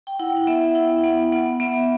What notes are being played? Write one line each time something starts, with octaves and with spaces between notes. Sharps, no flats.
G5
E4 F#5
F#5
B3 E5
E4 F#5
B3 F#5
B3 F#5
B3 E5